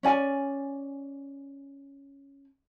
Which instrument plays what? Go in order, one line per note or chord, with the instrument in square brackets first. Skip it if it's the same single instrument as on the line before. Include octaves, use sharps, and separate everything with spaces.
[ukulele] C#4 D5 G#5